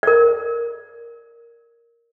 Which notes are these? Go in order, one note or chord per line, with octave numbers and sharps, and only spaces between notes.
A#4 D5